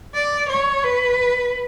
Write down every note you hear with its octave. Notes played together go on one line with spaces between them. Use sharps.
D5
C#5
B4